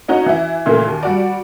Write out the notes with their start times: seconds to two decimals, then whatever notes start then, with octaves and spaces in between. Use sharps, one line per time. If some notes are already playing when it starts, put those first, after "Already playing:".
0.08 C#4 D#4 F#4
0.26 E3 E4
0.66 A#2 C#3 E3 A3 A#3
0.87 D#2
1.03 G3 F#4 D5